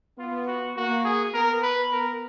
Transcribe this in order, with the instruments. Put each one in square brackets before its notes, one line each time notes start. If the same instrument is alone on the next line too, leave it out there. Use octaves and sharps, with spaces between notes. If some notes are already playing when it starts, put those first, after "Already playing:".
[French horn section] B3 [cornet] F4
[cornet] F#4
[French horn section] A#3 [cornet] F#4
[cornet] G#4
[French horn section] B3 [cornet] A#4
[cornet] B4
[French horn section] B3 [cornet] A#4